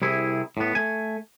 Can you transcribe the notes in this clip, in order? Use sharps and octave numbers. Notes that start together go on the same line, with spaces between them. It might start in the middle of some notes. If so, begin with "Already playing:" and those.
C2 C3 E4 G#4
A2 B3
A3 G#5